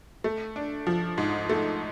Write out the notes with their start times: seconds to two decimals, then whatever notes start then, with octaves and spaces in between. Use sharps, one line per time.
0.24 A3
0.56 D4
0.87 F3
1.18 G#2
1.49 A3